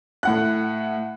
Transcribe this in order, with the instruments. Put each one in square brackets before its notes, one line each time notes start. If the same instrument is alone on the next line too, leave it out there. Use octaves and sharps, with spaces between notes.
[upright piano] A2 F#5 F#6